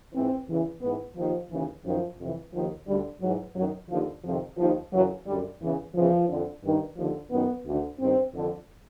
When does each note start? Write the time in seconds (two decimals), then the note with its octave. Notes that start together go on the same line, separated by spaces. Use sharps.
0.14 G#2 E3 C4
0.48 E2 C#3 E3
0.82 G#2 E3 B3
1.16 D#2 D#3 F3
1.51 D#2 C#3 E3
1.85 F#2 D#3 F3
2.19 F2 C3 E3
2.53 D#2 D#3 F3
2.87 D2 D3 G3
3.21 G#2 E3 F#3
3.55 F#2 D#3 F#3
3.90 D#2 D3 F3
4.24 F2 C3 D#3 F3
4.57 D#2 D#3 F3
4.92 F#2 C#3 E3 F#3
5.26 F#2 D3 G3
5.61 E2 C#3 E3
5.95 E2 C#3 E3 F3
6.29 F2 D3
6.63 G2 D#3
6.97 D#2 D3 F3
7.31 F#2 D#3 B3
7.65 D2 D3
8.00 G2 D#3 C4
8.34 F2 D3